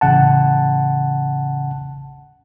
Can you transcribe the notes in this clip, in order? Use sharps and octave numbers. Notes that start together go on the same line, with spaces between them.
A1 C#3 F#5 A5